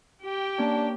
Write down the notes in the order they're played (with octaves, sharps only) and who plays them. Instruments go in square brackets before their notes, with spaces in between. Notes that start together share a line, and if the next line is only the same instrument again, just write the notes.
[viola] G4 G5
[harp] A#3 C#4 [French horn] D4